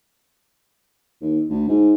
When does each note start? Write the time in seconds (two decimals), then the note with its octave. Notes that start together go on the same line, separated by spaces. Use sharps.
1.21 D#2
1.50 D2
1.68 G#2